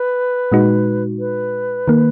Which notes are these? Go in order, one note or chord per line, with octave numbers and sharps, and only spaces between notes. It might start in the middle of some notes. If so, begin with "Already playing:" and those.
Already playing: B4
A#2 G#3 D#4 F#4
B4
D#3 A#3